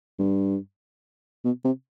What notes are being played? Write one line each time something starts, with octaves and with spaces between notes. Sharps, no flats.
G2
B2
C3